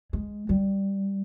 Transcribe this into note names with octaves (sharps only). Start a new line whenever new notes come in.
G#3
G3